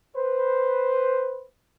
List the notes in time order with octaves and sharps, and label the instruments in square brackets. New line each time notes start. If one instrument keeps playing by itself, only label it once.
[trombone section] B4 C5